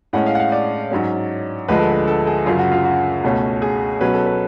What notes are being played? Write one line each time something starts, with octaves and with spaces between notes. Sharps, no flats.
A2 G#3 C#4 F#5
F5
F#5
F5
D5
G#2 F#3 C#4
D2 D3 F3 G#3 B4
A4
B4
A4
G#4
F#2 C#3 F#3 F4
F#4
F4
F#4
C#2 B2 A3 C#4
G#4
B2 F#3 C#4 B4
A4
B4